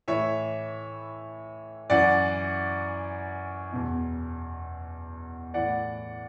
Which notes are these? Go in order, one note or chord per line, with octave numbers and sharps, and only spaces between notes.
A2 E3 C#5 E5
F#2 E3 D5 F#5
E2 B2
A2 E3 D5 F#5